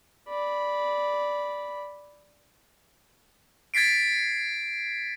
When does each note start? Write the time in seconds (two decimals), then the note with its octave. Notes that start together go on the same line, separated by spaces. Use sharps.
0.28 D5 B5
3.74 G#6 A6 B6 C7 D7